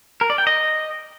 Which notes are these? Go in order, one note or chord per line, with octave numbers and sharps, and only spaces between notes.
A#4
D5
G5
D#5